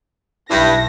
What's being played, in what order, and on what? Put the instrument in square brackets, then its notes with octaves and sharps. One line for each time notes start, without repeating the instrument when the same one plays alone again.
[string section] B1 A#6 [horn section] G2 [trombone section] E4